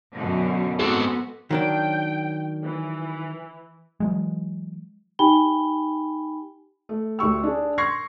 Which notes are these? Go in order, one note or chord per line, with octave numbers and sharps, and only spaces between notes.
F#2 B2 D3
G#2 B3 C4 F#4 A4
D#3 F#3 D4 G5
E3
E3 F#3 G#3
D#4 G4 G5 G#5 B5 G7
A3
D2 G4 C#6 E6
D4 G#4
C6 C#6 G#6 A#6 C7